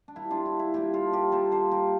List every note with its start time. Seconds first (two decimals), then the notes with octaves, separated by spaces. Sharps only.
0.08 D4
0.16 A#2 G3 A#3 E4
0.31 D4 F4
0.45 E4
0.59 E4
0.74 A#2 G3 A#3 E4 G4
0.93 F4 A4
1.13 G4 A#4
1.32 A#2 G3 A#3 A4 C5
1.52 A4 C5
1.71 G4 A#4